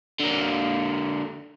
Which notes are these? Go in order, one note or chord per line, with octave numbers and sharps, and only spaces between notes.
D3 A#3